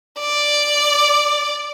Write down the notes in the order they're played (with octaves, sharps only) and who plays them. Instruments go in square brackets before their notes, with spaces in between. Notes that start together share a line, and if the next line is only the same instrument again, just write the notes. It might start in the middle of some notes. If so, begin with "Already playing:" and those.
[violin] D5